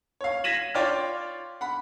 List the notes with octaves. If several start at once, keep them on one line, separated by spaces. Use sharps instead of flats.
C#5 F5
G#6 A#6 B6 D#7 E7 F#7
F4 C#5 D5 G5 C6 F6
F#5 B5